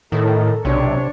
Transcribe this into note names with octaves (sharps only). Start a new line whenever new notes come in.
A2 D#3 A4 A#4
B1 C3 D4 C#5